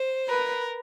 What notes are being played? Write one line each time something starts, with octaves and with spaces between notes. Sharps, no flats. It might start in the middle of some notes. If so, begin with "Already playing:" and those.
Already playing: C5
A#4 B4